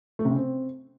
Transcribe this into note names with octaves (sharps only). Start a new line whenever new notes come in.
A3
C3
C#3
C4